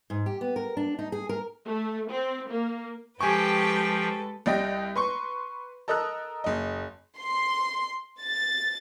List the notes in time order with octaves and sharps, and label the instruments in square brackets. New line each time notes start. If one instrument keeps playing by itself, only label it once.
[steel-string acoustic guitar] G#2
G4
B3
A#4
D4
D#4
G#4
A#4
[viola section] A3
C4
A#3
[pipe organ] F3 [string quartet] G#3 A4 B4 [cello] G4 G5 [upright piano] G#5 C#6
[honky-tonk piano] C2 G3 D#5 G5 A#6
B4 C6 C#6
A4 A#4 D#5 D#6 E6 F#6
F#1 D#5
[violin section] C6
A6